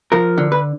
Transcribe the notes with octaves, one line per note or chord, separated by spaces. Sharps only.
F3 A#4
D3
B4